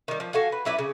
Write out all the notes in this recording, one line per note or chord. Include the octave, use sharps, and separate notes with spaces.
D#3 G3
F3
F#4 A4 F5 G#5
B4
F#3 E4 B4 D5
C#3